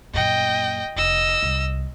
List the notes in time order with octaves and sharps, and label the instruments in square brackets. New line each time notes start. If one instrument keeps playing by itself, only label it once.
[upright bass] F#2 A#2 [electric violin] D#5 G5
[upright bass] F1 [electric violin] D#5 E6
[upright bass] C2